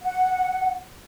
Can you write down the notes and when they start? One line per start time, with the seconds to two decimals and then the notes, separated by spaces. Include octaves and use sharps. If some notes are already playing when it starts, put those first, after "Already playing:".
0.01 F#5